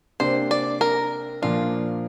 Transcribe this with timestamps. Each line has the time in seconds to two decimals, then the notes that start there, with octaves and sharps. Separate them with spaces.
0.20 C3 A#3 D4 C5
0.51 D5
0.81 A#4
1.42 A#2 F3 A#3 D4 F4